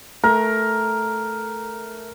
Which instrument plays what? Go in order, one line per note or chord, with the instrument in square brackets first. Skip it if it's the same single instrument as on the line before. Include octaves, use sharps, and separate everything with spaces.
[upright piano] A3 [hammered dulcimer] A#4